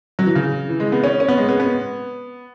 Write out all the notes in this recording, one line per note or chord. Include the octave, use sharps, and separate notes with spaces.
F#3
E3
C#3
E3
G#3
B3
C#4
C#4
B3
G#3
B3
B3